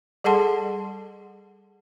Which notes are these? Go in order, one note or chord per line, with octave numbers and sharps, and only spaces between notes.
G3 G#4 A4 F#5 A5 C6